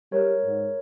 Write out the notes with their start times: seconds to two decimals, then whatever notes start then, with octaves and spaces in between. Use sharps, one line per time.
0.12 G3 A#4 C#5
0.44 G#2